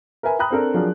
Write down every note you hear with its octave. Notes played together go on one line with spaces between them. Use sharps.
A#4 B4 E5 G#5
G5 A#5 B5 D#6 F#6
C4 D4 A4 A#4
F3 F#3 D4 G#4 A#4